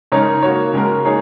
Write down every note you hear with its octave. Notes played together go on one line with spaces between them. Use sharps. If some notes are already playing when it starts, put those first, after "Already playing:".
C#3 G#3 D#4 A#4 C#5
A#3 F#4 C#5
C#3 G#3 F#4 A#4
A#3 D#4 G#4 C#5